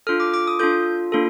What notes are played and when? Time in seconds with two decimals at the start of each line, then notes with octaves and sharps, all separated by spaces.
0.07 D4 F4 A4 F6
0.20 D6
0.34 D6
0.47 D#6
0.59 D4 F4 A4 G6
1.12 A#3 D4 F4 A4